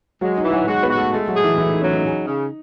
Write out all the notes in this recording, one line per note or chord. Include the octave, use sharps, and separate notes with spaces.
F#3 G#3 F#4
D#4
E3
F#3 F#4
G#3 F#4 G#4
B3 B4
F#4
A3 A4
G#3 A3 G#4
F#3 F#4
G#4
E3 E4
E3 A3 E4
D#4
F#3 C#4
D#4
C#3
C#3